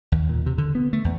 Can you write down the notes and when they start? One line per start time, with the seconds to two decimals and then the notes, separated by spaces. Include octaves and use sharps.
0.12 D#2
0.29 A#2
0.46 C3
0.58 D3
0.75 B3
0.93 A3
1.05 E2